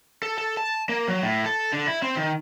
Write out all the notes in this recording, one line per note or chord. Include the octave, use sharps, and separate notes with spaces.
A4
A4
A5
A#3
F#3
A2
A4
D3
E4
C4
D#3